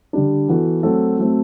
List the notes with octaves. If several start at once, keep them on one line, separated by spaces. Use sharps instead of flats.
D3 G3 D4
E3 B3 F#4 A4
F#3 A3 C4 F#4 A4
F#3 A3 C4